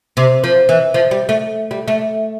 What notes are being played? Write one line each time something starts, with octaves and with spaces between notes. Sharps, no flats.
C3
F3
E3
F3
G3
A3
G3
A3